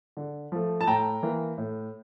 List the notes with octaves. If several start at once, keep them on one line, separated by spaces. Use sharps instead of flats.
D3
F3 A3
A5
A2 G5 A#5
E3 A#3
A2